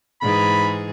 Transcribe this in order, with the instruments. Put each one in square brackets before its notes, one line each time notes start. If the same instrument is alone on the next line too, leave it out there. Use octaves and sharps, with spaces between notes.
[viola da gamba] G#2 E3 G#4 [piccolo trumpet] B5